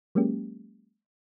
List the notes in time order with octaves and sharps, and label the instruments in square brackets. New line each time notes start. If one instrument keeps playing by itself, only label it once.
[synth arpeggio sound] F#3 G#3 A#3 C#4 G4